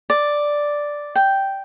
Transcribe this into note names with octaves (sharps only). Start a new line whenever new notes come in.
D5
G5